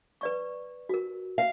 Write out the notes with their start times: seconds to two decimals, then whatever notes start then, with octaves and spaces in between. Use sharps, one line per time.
0.21 B4 D5 C#6
0.89 F#4 A#4
1.38 F5